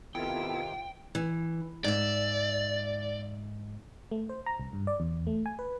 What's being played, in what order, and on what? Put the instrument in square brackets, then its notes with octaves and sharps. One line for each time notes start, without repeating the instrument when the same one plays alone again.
[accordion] C3 D#3 [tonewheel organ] B3 E4 A4 [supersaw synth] F4 [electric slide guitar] G5
[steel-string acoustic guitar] E3
[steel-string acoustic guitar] G#2 E5 [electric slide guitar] D5
[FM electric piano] A3
C5
A#5
C2
G2
D5
E2
A3
G#5
B4